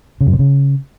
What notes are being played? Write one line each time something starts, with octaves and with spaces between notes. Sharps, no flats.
C#3
F#2
C3
C#3